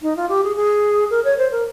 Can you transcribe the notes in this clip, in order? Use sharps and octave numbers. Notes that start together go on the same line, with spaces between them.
D#4
F4
G4
G#4
G#4
A#4
C#5
C5
A#4